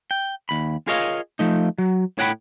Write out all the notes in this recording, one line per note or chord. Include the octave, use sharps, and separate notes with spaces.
G5
D#2 B5
F4 G#4 A#4 C#5 D#5 F5
F3 A3 D#4
F#3
A2 C#5 F#5 G5 A5 B5